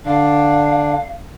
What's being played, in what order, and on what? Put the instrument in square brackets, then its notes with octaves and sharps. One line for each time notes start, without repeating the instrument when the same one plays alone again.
[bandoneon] D3 D4 [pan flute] F5